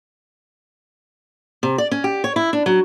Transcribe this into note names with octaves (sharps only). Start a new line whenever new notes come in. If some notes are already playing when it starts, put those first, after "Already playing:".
C3
D5
C#4
G4
C#5
E4
D4
F#3